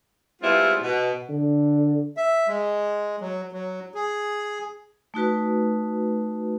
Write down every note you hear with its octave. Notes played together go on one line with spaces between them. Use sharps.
G3 G#3 B3 C4 E4 F4
B2
D3
E5
G#3
F#3
F#3
G#4
A3 D#4 F#4 B4